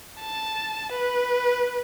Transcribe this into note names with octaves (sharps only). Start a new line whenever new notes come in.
A5
B4